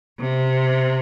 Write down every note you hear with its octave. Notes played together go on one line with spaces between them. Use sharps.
C3